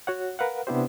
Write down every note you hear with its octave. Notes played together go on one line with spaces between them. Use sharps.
F#4 C#5 F#5
A#4 B4 F5 F#5
C3 B3 D4 E4 G4 C5